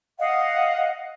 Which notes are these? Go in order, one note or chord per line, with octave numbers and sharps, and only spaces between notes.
D#5 F5 F#5